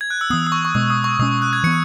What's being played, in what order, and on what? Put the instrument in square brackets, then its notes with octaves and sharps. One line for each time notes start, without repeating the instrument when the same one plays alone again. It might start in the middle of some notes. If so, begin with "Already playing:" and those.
[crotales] G#6
F#6
E6
[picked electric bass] E3 B3 [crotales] D#6
[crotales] D#6
C#6
C#6
[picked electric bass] B2 G#3 B3 [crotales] D#6
[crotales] D#6
C#6
[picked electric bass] B2 G#3 C#4 [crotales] D#6
[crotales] F#6
G#6
[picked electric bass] E3 B3 [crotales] C#7